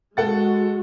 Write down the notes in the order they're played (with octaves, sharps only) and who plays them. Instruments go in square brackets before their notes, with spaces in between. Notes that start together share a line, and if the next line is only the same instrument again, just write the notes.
[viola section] G#3 F#4 [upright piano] A4 F#5 A6